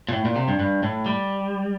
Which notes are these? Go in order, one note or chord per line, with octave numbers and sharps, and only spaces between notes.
A#2
A2
A#2
C3
G2
G2
A2
G3